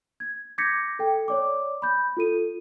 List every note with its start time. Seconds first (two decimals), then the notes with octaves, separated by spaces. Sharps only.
0.20 G#6
0.58 D6 G6 G#6 A#6 B6 C#7
0.99 A4 G5
1.28 C#5 D5 D6
1.82 B5 G6
2.17 F4 A4 D#7